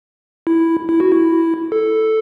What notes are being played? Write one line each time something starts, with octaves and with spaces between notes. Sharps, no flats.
E4
E4
F#4
E4
A4